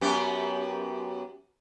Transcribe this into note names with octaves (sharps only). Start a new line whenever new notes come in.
F#2 B3 G4